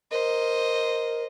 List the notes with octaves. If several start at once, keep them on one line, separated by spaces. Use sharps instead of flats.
A#4 C5 D#5